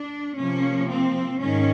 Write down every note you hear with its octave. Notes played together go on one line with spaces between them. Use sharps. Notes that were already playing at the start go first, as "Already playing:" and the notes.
Already playing: D4
C3 F3 A#3 C#4
C4
G#2 D#3 C#4